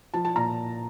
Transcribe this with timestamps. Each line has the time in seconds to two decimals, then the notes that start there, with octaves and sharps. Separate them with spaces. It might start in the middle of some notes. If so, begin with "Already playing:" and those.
0.14 F3 A5
0.25 A5
0.36 A#2 A#5